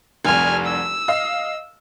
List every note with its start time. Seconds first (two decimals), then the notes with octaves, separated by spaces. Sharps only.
0.25 F1 C2 G#5 F6
0.65 E6
1.08 D#5 F5